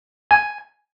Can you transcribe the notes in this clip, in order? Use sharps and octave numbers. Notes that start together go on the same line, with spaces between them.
G#5